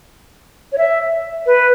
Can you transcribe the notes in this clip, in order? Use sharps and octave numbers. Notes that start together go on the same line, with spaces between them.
C#5
E5
B4